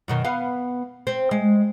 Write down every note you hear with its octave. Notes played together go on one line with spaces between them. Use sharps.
F#2 B2 D#3
B3 F5
C4
G#3